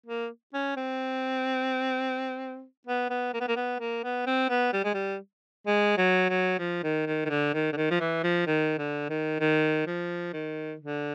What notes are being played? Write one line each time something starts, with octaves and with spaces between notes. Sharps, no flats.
A#3
C#4
C4
B3
B3
A#3
B3
A#3
B3
A#3
B3
C4
B3
G3
G#3
G3
G#3
F#3
F#3
F3
D#3
D#3
D#3
D3
D#3
D3
D#3
F3
E3
F3
D#3
D3
D#3
D#3
F3
D#3
D3